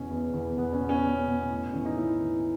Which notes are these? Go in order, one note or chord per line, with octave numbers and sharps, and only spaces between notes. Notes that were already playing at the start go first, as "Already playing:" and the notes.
Already playing: E2 B2 C#4
E2
E2
E2 B3
C#4
B2
C#4
B2
B2
A2
E3 C#4
D#4
E3 E4
E3